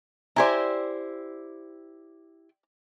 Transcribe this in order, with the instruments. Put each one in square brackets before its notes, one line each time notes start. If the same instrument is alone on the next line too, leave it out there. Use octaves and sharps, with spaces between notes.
[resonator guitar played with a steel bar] E4 G4 C5 [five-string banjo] D5 G#5 A#5